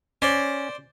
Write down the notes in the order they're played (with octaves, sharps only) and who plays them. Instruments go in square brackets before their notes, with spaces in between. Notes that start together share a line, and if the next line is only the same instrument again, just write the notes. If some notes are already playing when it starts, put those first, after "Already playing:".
[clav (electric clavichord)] C#4 [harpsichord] C5 D5